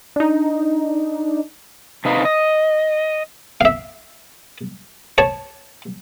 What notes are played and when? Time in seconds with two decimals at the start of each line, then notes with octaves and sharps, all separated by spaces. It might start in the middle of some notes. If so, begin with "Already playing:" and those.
0.16 D4 D#4
2.05 C3 D#4 B4 F5
2.25 D#5
3.61 E5 F5
5.18 C#5 A5